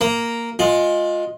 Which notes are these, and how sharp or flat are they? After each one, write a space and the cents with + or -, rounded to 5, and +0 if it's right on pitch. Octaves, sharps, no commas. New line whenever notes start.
A#3 +0 A#5 +0
G#3 +0 F4 +15